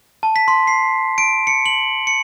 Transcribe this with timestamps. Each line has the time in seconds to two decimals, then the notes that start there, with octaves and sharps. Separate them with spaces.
0.23 A5
0.36 B6
0.48 C6
0.67 C7
1.18 D7
1.47 C#7
1.66 F#7
2.07 C#7